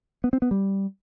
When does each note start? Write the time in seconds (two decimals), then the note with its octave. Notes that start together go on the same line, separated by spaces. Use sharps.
0.24 B3
0.33 C4
0.42 B3
0.51 G3